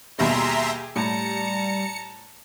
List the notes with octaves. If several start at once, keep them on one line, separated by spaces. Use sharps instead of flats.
D#2 B2 G3 G4 G#4 E5 A#5 C6
A2 G3 A5 A#5 C#7